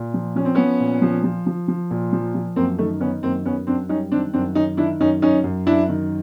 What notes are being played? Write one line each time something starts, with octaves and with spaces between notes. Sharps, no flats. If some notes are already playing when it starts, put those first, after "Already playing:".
Already playing: A#2
F3
F3 C#4
C4
F3 B3 C#4
A#2
F3
F3
F3
F3
A#2
F3
F3
F#2 A#3 C4
D#3 A3
D#3 B3 C#4
F#2 A#3 C4
F#2 B3 C#4
F#2 C4 D4
G3 C#4 D#4
D#3 C4 D4
F#2 C4 D4
D#3 C#4 D#4
D#3 D4 E4
F#2 C#4 D#4
F#2 C#4 D#4
F#2
F#2 D4 E4
D#3